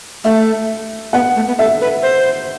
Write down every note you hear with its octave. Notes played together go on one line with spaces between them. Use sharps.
A3 E5
B3 F#5
A3
B3
A4 E5
B4
C5